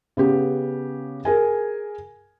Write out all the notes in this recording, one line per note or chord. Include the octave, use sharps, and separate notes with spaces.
C#3 B3 G4
G#4 A#4 G#5